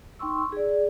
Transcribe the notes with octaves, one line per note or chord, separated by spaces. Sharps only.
D#4 G5 C6 C#6 E6
G#4 D5